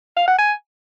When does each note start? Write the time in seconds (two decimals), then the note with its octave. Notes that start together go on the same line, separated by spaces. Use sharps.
0.17 F5
0.27 F#5
0.38 G#5